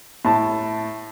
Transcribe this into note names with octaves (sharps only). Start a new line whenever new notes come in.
A2 A5